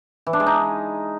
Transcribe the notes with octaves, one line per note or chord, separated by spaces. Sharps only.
E3
D4
G#3
D#4